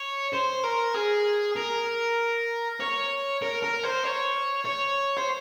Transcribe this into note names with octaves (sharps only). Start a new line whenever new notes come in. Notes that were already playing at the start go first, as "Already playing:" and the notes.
Already playing: C#5
C5
A#4
G#4
A#4
C#5
A#4
A#4
C5
C#5
C#5
C5